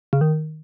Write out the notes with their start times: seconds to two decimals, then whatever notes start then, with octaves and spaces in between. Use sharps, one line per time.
0.13 C#3
0.21 D#3